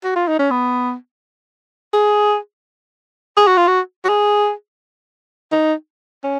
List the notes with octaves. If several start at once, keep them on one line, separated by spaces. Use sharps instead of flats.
F#4
F4
D#4
C#4
B3
G#4
G#4
F#4
F4
F#4
F#4
G#4
D#4
C#4